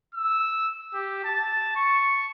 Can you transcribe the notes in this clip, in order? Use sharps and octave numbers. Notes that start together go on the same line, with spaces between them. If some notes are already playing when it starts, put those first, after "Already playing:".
E6
G4
A5
C#6